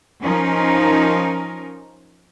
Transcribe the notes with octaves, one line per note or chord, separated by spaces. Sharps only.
F3 C#4 D#4 A#4